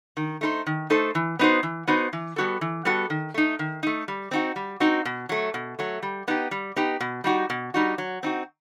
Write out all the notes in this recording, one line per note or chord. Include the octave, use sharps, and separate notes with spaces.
D#3
A3 D#4 A4 C5
D#3
A3 D#4 A4 C5
E3
B3 D#4 F#4 C5
E3
B3 D#4 F#4 C5
E3
G3 B3 F#4 A4
E3
G3 B3 F#4 A4
D#3
A3 D#4
D#3
A3 D#4
G3
C4 D#4 F#4
G3
C4 D#4 F#4
B2
F#3 A3
B2
F#3 A3
G3
B3 D#4 G4
G3
B3 D#4 G4
B2
G3 D#4 F#4
B2
G3 D#4 F#4
F#3
C4 D#4 F#4